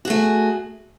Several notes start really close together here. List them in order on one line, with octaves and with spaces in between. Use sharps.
F#4 G#4 A3